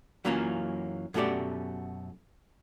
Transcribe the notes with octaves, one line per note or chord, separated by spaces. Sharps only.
F#2 E3 F#3 A#3 C#4 F4
F#2 B2 A3 F#4 G4 D5